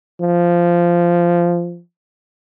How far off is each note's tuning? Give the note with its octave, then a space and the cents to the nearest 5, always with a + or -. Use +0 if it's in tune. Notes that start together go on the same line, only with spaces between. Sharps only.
F3 -10